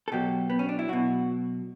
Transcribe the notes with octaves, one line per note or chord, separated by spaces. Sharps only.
A4
B2 F#3 G4
B3
C#4
D4
E4
B2 F#3 F#4